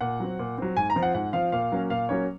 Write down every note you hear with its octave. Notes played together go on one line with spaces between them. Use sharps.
A#2 F#5
F#3 C4
A#2
F#3 C4
G#2 G#5
A#5
F3 C4
F#5
G#2 F#5
F3 C4 F5
A#2 F5
F#3 A#3 C#4
A#2 F5
F#3 A#3 C#4 C#5